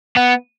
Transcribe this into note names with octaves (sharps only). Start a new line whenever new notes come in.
B3